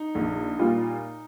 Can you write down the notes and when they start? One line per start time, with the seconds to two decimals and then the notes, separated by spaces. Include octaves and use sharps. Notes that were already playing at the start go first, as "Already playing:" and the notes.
Already playing: D#4
0.15 A#1
0.59 A#2 G3 A#3 F4